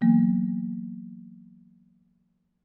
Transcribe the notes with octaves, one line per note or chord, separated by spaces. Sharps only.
E3 F#3 A#3 B3